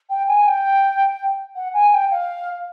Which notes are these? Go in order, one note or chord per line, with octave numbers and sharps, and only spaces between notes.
G5
G#5
G5
F#5
G#5
G5
F5